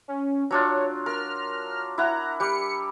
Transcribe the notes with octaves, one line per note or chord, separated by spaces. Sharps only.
C#4
F#3 D4 F4 C#5
A#4 F6
E4 F#5 A#5
G3 G4 C#7